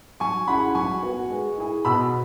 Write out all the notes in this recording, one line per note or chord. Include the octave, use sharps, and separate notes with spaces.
F#3 G#5 C#6
C#4 E4 G#4 F#5 B5
F#3 G#5 C#6
B3 F#4
G#3
E4 G#4
B2 B5 E6